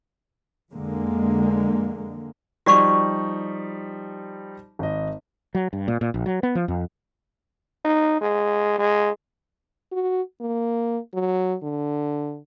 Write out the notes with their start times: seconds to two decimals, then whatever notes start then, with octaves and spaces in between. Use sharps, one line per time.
0.73 F2 D3 G#3 A#3
2.66 F3 G3 D#4 F#4 D5 C#6
4.79 G#1 D#5
5.55 F#3
5.73 G2
5.88 A#2
6.01 A#2
6.14 A#1
6.26 F#3
6.43 B3
6.55 F3
6.68 F2
7.85 D#4
8.21 G#3
8.78 G#3
9.92 F#4
10.41 A#3
11.14 F#3
11.63 D3